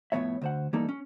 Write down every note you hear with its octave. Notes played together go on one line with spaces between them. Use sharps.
F2 A2 D#3 B3 C#5 E5
D2 C5 F#5
E3 G3 A#3 D#4 A4
C#4